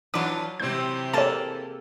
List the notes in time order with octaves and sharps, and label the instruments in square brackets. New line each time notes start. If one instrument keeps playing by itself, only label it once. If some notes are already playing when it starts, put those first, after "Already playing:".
[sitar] E3 D4 F4 [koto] F#3 B4 [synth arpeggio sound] D6
[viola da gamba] C3 G4 [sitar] E3 C4 [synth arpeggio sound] G6
[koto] A#3 G#4 A4 [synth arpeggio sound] C#5 A5